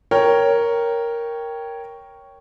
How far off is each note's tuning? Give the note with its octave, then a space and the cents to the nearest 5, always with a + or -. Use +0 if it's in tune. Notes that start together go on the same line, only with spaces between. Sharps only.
A#4 +0 C#5 +0 G5 +0